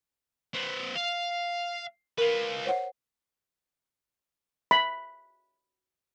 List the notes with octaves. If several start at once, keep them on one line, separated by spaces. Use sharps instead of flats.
C4 B4
F5
F4 A#4 B4
C5 C#5 F#5
B5